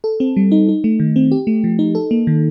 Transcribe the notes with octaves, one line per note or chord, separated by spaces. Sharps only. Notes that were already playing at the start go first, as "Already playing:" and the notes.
A4
C4
G3
D#4
D#4
A3
D#3
C4
G4
A3
F3
D#4
A4
A#3
D#3